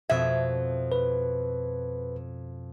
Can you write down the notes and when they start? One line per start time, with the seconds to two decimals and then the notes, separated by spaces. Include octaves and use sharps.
0.09 F2 B2 E5 G#6
0.92 B4